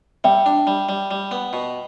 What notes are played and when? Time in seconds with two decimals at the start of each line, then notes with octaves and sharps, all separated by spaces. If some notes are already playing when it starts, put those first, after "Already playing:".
0.24 G3 E5 G5
0.46 D4
0.67 G3
0.89 G3
1.11 G3
1.31 B3
1.53 B2